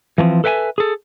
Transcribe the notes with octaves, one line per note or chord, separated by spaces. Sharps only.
E3 F3 A#3 C4
A4 B4 E5 G5 G#5
G#4 A4